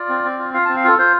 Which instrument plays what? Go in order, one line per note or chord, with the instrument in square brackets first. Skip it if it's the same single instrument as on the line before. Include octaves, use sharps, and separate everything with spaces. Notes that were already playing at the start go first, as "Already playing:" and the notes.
Already playing: [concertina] F4 D5
C4
C4
F4
F4 F5
C4 A5
F5
F4 A4
F4 C5